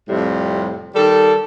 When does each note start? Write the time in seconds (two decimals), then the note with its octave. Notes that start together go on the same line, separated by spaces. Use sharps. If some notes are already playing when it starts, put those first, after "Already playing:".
0.08 F2 A2 C3 G3
0.95 D#3 G3 A4